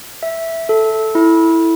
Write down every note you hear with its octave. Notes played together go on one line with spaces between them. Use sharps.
E5
A4
E4